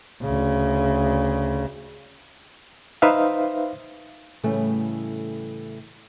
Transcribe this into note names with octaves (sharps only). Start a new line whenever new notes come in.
D2 C#3
D#4 B4 C5 E5 F5
A2 C#3 E3 G3 A3